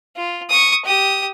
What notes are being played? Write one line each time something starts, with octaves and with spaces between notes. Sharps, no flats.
F4
C#6 D#6
G4 D#6